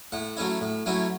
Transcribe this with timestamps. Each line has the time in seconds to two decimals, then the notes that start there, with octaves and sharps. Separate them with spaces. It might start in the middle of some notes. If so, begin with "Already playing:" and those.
0.12 A2 F#5
0.37 F#3 A3 C#4 E4
0.61 A2
0.86 F#3 A3 C#4 E4